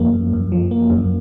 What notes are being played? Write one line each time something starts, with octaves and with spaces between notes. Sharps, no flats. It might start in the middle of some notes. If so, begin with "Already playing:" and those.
Already playing: F#2 F3 A#3
F#2
F#2
F3
A#3
F#2